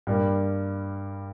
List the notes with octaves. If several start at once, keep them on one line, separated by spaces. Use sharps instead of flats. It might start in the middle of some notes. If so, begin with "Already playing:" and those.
G2 G3 A#3